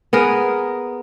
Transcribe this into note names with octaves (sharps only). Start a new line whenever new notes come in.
B3 G#4 A#4